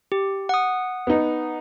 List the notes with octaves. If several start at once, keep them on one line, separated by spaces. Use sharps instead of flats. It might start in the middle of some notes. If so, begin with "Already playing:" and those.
G4
F#5 D#6
B3 D#4